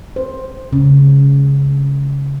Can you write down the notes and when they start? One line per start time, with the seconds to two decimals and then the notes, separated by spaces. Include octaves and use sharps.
0.16 C5
0.73 C#3